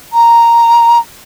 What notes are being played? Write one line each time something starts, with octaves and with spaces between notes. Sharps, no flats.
A#5